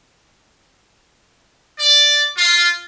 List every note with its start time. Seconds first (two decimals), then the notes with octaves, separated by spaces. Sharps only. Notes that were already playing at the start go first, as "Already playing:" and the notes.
1.78 D5
2.37 F4